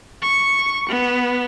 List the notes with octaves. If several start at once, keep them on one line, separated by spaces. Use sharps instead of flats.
C#6
B3